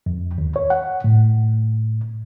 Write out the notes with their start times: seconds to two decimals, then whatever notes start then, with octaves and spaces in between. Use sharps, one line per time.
0.06 F2
0.38 D#2
0.56 C#5
0.70 F#5
1.04 A2